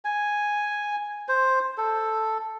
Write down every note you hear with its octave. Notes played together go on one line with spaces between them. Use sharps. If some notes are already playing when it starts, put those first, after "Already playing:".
G#5
C5
A4